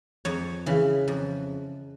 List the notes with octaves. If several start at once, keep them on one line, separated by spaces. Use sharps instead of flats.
F2 C#5
C#3 E3
F2